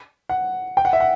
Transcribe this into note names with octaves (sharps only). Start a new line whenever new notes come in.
F#5
G5
F#5
E5
F#5